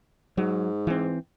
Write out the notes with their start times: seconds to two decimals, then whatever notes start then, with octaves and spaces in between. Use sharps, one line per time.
0.37 G#2 F#3
0.87 E3 C4